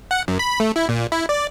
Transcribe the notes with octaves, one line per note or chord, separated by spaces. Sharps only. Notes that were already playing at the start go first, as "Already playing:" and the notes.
F#5
F#2
B5
A3
E4
A#2
E4
D5